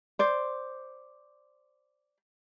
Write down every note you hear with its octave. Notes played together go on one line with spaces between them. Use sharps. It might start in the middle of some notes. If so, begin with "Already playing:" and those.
C5 D5